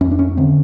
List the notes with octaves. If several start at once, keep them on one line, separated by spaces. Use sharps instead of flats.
F2 C#4
D4
C#4
D3 C4